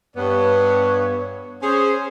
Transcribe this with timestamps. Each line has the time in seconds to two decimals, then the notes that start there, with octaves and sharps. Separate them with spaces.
0.17 G2 B3 C#5
1.62 C#4 G#4 C5